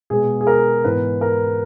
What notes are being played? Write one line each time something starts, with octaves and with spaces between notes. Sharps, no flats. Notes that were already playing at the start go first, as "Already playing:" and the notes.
B2 G#3 B3 G#4
G#4
A#4
G#2 E3 B3 B4
A#4